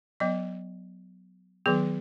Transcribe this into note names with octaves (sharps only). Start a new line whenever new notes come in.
F#3 B3 D#5
D#3 F#3 B3 G#4